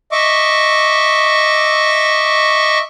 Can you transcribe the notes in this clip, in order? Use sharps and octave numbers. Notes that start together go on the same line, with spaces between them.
D#5 E5 C#6 D6